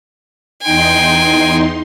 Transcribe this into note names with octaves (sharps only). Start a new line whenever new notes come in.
E2 D#4 G5 G#5 C6